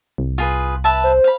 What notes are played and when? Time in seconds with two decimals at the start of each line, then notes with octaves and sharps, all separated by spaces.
0.18 C2
0.38 F4 G#4 B4
0.84 B4 E5 A5
1.04 C5
1.24 F5 B5